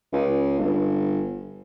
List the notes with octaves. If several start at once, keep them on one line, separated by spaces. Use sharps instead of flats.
C#2
G1